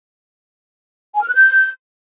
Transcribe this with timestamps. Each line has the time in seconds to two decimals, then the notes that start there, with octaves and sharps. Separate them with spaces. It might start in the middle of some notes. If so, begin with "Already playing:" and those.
1.14 G#5
1.21 F6
1.28 F#6
1.35 G6